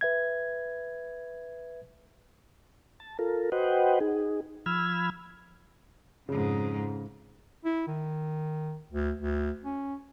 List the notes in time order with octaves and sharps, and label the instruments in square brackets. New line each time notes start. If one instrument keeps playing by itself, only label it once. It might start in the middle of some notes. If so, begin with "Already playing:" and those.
[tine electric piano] B4 E5 G#6
[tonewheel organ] A5
F4 A4 A#4
F#4 B4 C5 D#5 F#5 G5
D#4 G#4
F3 B5 E6 F6 G#6
[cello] F2 G#2 [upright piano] C#3
[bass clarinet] E4
D#3
D2
D2
C#4